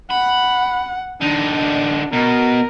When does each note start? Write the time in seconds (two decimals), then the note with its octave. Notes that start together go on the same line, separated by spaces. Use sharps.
0.10 F#5 B5
1.21 D3 D4 D#4
2.13 B2 A#4